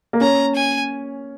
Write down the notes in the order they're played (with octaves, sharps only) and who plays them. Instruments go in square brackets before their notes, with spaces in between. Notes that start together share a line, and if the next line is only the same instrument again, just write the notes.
[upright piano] A#3
[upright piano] C#4 [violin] A#5
[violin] G#5